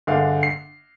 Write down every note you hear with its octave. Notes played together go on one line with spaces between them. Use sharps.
G1 D3 G#4 F5
C7